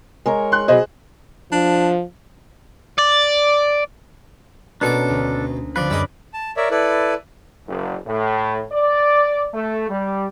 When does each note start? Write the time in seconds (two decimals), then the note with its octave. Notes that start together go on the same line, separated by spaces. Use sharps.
0.26 G#3 A#4 C#5
0.52 C6 F#6
0.68 B2 F#3 G#4 C5 D#5
1.52 F3 D4
2.98 D5
4.81 B2 A#3 C#4 D4 A4 C6 D6
5.09 D2
5.76 D3 F3 C4 B4 D5
5.90 F#2 G3 F#4 G#4 D#5
6.34 A5
6.57 A#4 C#5 D5 E5
6.70 E4 A4 B4 D5
7.67 F#1
8.07 A2
8.73 D5
9.54 A3
9.89 G3